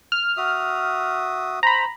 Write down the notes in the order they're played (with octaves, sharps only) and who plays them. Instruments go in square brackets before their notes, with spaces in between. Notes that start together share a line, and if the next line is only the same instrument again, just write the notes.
[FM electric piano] F6
[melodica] F#4 E5 D#6
[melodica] C5 [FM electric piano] A#5 B5